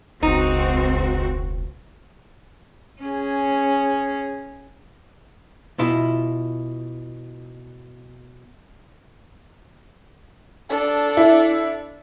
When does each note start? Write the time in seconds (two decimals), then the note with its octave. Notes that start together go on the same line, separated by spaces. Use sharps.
0.23 E1 C#2 C4 D#4 F#4
3.02 C#4 G#4
5.79 B2 E4 F4
10.70 D4 A4
11.17 E4